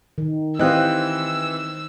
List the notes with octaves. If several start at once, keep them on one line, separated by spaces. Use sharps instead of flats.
D#3
E3 C4 G4 C5 D#5 F5 E6 F#6